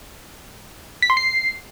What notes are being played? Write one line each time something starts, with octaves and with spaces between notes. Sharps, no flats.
B6
C6
C7